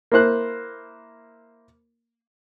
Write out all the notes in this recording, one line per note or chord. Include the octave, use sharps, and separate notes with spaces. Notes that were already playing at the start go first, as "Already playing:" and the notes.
A#3 E4 C5 F#6